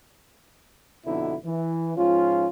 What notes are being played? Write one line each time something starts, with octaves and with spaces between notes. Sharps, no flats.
F2 B2 D3 B3 D#4 E4
E3
G#2 F3 C#4 F4